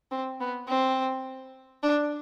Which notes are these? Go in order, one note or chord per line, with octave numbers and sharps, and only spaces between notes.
C4
B3
C4
D4